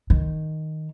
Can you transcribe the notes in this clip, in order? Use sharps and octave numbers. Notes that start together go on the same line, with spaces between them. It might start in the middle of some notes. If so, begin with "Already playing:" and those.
D#3